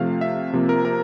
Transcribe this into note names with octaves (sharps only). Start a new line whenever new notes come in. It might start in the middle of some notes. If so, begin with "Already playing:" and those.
Already playing: C3 F3 A3 F5
E5
C3 F3 A#3
A#4
A#4